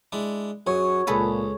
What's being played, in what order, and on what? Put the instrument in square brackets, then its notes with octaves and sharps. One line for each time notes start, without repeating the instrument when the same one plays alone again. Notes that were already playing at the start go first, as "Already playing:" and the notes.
[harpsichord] G#3 D4 E4
[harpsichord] F#2 G#4 [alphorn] F#4 [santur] C#5
[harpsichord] C#2 [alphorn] A#2 [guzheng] G#4 A4 B4